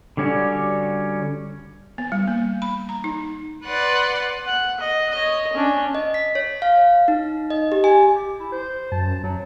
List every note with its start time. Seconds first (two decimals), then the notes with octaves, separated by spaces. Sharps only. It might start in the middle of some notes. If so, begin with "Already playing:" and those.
0.17 D3 G3 C#4 F#4
1.98 B3
2.12 G3
2.27 A#3
2.62 B5
2.89 A#5
3.04 D#4
3.65 B4 D5 F#5 C6
4.46 F#5
4.80 D#5
5.10 C#5 D#5
5.53 C#4 D4
5.95 D#5
6.14 B6
6.35 C#5
6.62 F5
7.08 D#4
7.50 D#5
7.72 G4
7.84 G#5
8.16 G4
8.40 E4
8.52 C5
8.92 F#2 A5
9.24 F#2 F#3